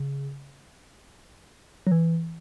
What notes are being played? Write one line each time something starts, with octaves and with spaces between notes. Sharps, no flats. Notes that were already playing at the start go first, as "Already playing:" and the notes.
Already playing: C#3
F#3
E3